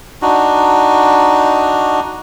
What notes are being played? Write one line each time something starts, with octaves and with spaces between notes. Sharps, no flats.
D4 D#4 F#4